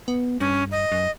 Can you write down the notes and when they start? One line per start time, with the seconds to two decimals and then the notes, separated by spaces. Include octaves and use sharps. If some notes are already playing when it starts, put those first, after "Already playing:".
0.08 B3
0.40 G2 C#4
0.72 D#5
0.92 F#2